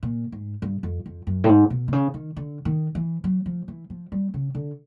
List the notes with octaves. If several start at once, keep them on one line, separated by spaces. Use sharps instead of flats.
A#2
G#2
G2
F2
F2
F#2
A2
G#2
B2
C3
C#3
D#3
D3
D#3
E3
F#3
F3
E3
F3
G3
C#3
D3